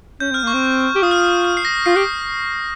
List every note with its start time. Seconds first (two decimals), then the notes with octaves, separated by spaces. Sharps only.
0.20 C#4 G6
0.31 C4 F6
0.43 A#3 C#6
0.53 C4
0.95 G4
1.02 F4 D#6
1.11 F6
1.21 D#6
1.45 F6
1.57 C7
1.65 A#6
1.86 F4 C7
1.96 G4 C7